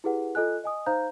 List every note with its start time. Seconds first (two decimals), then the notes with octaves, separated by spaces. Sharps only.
0.04 E4 G4 G#4 B4 F#5
0.35 F4 A4 D#5 G#5 F#6
0.64 D#5 G#5 D#6
0.86 D#4 C5 F5 A#5 G6